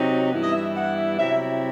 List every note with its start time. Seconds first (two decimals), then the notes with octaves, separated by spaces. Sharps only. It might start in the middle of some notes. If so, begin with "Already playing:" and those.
Already playing: C3 F#3 C4 D#4
0.31 G2 E3 G3 B3 E4
0.43 D#5
0.53 E5
0.75 F#5
0.97 E5
1.19 C3 F#3 C4 E4 E5